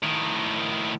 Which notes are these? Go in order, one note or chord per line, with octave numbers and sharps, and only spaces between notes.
A2 D#3